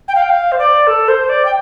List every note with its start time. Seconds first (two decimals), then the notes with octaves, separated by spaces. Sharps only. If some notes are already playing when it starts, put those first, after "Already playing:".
0.08 G5
0.15 F5
0.22 G5
0.30 F5
0.52 C5
0.58 D5
0.87 A4
1.08 C5
1.29 D5
1.45 G5